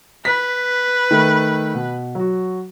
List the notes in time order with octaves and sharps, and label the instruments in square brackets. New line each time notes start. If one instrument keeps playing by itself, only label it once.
[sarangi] B4 [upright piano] B6
[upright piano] D#3 A3
B2
F#3 F#4